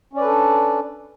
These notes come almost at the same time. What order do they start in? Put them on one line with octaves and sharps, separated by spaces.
C#4 D5 B4 A4 D4